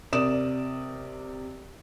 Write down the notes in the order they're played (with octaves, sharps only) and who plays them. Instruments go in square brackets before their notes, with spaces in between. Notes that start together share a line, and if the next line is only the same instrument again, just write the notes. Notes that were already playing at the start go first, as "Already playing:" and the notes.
[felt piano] C3 A#4 D5 D#6 E7